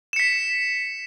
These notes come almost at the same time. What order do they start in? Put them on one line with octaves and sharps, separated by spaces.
E7 C#7 B6